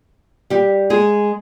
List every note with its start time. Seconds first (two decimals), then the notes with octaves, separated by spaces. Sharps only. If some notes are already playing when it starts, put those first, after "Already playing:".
0.50 G3 G4
0.90 G#3 G#4